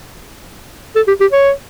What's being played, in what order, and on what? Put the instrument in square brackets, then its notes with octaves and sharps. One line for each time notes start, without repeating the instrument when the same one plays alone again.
[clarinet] A4
G4
G4
C#5